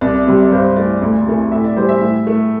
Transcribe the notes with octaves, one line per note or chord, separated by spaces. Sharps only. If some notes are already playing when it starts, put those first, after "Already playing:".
C2 D5
C3 G3
D5
G2 C5
E3 A3 D5
D2
C3 E3 A3
A2 E5
D5
E3 G3 C5
E5
A2
A3